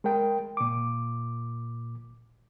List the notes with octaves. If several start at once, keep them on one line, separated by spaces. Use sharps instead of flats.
G#3 A#4 G5
A#2 D6